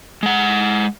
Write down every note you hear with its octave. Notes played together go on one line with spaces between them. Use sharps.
G#3 F#5